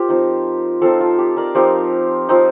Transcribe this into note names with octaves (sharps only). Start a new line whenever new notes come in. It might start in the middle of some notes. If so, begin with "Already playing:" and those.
Already playing: F4 G4 A#4 C5
F3 C4 D#4
F3 C4 D#4 F4 A4
F4
G4
A#4 D5
F3 C4 D#4 G4 A#4
F3 C4 D#4